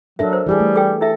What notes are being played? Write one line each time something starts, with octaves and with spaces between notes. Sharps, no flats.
F#3 D4 A4 A#4 E5
C5
E3 G3 G4 G#4
A3
A4 G5
E4 A4 E5